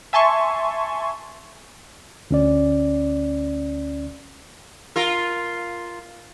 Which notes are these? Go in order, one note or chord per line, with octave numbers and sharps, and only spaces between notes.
E5 G#5 A5 C6 C#6
D2 C#4 D5
F4 A#4